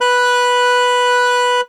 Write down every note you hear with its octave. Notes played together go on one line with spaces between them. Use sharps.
B4 F#6